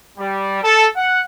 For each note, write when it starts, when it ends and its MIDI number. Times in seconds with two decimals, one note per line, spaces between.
0.18 0.60 55
0.63 0.86 69
0.96 1.21 78